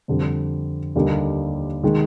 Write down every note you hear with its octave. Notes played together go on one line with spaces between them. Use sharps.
F2 D3 G3
D#2 D3 G3 A#3 D#4
D#3 G#3